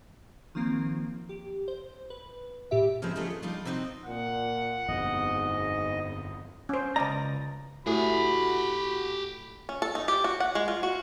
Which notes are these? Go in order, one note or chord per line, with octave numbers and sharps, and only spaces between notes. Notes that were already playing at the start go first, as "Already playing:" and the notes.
D#3 F3 A#3 C4
G4
C5
B4
A2 G4 E5
C#3 F3 G#3 B3 C4
A3 C#4 D#4 F4 G4 G#4
B3
F3 G3 D4 D#4 F4
C3 B3 C4 D#4 F#4
A#2 F#5
G1 F2 G#2 B2 D#5
C#4 C5
C#2 D5 D#5 A#5
A2 F#4 G4 G#5 B5
C#4
A4
D#4
G4
F#4
F#5
G#3
F4
F#4